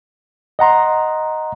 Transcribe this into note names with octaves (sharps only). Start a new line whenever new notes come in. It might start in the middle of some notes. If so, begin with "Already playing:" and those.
D#5 F#5 A#5 C6